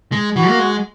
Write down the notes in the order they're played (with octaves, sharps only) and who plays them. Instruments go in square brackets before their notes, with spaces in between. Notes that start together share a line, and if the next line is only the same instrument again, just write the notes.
[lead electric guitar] G#3
[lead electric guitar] E3 [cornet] F#4
[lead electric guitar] A#3
G#3